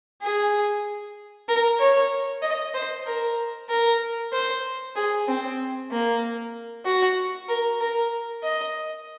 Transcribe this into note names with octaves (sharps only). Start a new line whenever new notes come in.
G#4
A#4
C#5
D#5
C5
A#4
A#4
C5
G#4
C4
A#3
F#4
A#4
A#4
D#5